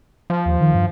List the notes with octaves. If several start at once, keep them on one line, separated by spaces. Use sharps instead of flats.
F3
D#2
D#3
G2